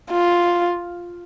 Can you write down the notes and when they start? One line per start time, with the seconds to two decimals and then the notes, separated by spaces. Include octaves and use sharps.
0.11 F4